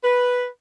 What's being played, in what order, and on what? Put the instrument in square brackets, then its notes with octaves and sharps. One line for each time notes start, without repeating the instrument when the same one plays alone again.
[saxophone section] B4